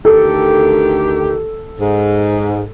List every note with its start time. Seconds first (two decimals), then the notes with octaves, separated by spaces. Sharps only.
0.05 D2 D#3 G4 A4
1.79 G#2